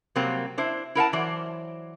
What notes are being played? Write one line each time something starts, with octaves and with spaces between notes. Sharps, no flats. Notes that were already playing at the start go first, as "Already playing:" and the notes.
C3 F#3 G3 A#3 C4
D4 E4 C5
E4 A#4 F#5 A5
E3 F#3 C5 D5